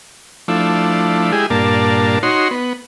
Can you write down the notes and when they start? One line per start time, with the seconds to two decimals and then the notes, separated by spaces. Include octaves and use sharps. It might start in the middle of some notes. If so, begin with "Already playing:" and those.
0.48 F3 A3 D4 E4
1.32 G#3 E4 G4 G#4
1.50 G2 A#2 A#3 D4 A5
2.23 D#4 F#4 C#5 C6
2.51 B3